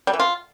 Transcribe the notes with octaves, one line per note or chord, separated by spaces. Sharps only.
G3
E3
F4